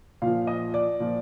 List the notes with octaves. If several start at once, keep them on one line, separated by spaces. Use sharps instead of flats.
A#2 F3 F5
D#5
D5
A#2 F3